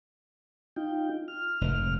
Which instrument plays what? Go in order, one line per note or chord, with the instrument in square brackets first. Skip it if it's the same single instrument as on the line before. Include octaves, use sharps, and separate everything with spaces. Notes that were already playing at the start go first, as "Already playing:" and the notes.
[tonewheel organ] D#4 F4 G5
F6
[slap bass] F1 G#2